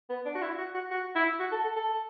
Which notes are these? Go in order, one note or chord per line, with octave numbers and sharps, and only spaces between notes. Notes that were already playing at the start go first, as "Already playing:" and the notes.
B3
D4
F#4
E4
F#4
F#4
F#4
E4
F#4
A4
A4
A4